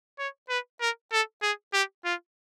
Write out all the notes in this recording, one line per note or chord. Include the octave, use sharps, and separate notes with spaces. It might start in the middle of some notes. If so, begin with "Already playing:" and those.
C#5
B4
A#4
A4
G#4
G4
F4